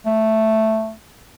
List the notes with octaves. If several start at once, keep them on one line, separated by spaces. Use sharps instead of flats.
A3